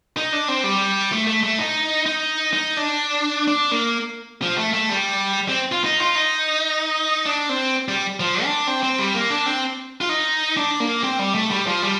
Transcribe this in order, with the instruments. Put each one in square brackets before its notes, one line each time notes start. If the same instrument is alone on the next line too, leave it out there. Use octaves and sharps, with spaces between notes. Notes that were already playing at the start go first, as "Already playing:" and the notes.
[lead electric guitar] D#4
D4
C4
G3
A3
A3
A3
D#4
D#4
D#4
D4
D4
A#3
F3
A3
A3
G3
C4
F4
D#4
F4
D#4
D4
C4
G3
F3
D4
C4
C4
G3
A#3
D4
C4
F4
D#4
D4
A#3
C4
G3
A3
G3
F3
G3